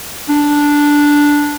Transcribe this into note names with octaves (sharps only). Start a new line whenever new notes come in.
D4